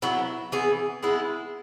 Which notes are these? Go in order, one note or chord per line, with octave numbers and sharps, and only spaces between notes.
F#3 B3 E4
E3 B3 G#4
G#3 B3 E4